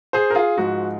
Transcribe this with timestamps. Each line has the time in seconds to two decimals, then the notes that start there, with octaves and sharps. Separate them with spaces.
0.13 G#4 C5
0.30 A#4
0.35 F4 G#4
0.57 G#2 F3 G#3 F#4